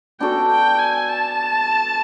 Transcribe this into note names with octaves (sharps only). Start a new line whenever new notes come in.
B3 D4 F#4 A4 G5
G5
G#5
A5